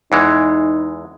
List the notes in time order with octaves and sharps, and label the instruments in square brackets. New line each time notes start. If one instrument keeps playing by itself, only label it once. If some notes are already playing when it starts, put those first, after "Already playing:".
[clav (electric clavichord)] E2 E3 G#3 [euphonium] D#4